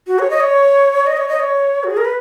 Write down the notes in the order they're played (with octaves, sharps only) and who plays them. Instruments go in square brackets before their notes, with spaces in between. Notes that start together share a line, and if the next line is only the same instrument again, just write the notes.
[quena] F#4
C#5
D#5
C#5
D#5
C#5
D#5
C#5
F#4
G#4
A#4
B4